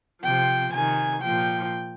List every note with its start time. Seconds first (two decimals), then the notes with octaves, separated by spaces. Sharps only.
0.22 C3 F3 G5
0.73 C3 D#3 G#5
1.23 A#2 F3 G5